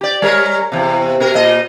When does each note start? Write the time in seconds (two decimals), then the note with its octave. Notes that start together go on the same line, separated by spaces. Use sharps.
0.01 G4 D5
0.22 G3 A#4 C#5
0.72 E2 C3
1.20 B2 A#4
1.35 A#2 D#5